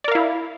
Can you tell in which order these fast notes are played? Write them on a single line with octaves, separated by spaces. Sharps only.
D5 A#4 F5 E4